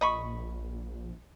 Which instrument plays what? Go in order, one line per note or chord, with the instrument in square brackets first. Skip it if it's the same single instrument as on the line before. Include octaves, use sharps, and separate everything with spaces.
[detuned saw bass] A#1 [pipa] D#5 B5 C#6